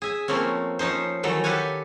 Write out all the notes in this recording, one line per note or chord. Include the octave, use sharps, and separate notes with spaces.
G#4 E5 G#5
F3 A3 A#3 C4 C#4
F3 C#4 D#4 C5
D#3 E3 F#3 A3 A4
G4 A4 B4 F5 F#5 G#5